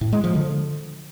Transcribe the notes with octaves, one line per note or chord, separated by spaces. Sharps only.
A2
G#3
F3
D3